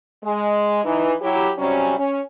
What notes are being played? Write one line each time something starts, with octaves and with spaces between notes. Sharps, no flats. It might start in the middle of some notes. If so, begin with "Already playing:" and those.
G#3
E3 D#4
F#3 E4 G4
C3 F#3 G3 C#4
C#4